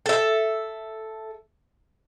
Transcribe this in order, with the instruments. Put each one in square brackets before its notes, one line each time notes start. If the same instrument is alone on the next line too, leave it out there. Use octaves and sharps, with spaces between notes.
[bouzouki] A4 E5